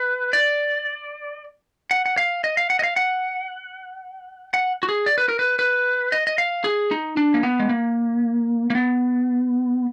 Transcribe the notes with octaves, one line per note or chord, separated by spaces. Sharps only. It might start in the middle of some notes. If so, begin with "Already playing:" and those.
Already playing: B4
D5
F#5
F#5
F5
D#5
F5
F#5
D#5
F5
F#5
F#5
F#4
G#4
D5
B4
A#4
B4
B4
D#5
D#5
F5
G#4
D#4
D4
A#3
B3
G#3
A#3
A#3
B3